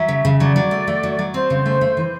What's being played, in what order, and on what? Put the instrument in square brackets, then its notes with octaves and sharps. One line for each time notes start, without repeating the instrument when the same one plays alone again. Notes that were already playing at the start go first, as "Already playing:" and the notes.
Already playing: [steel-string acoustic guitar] F#3 [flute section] E5
[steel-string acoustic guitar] C#3
C#3
[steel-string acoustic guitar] F#3 [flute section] D5
[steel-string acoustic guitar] F#3
A3
A3
F#3
F#3
[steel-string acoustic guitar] C4 [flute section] C5
[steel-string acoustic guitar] C#3
A3
A3
E3